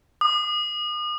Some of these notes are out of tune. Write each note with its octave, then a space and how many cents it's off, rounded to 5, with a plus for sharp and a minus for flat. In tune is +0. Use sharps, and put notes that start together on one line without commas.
D#6 -40